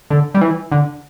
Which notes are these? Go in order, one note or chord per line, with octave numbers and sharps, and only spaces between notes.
D3
G3
E3
D3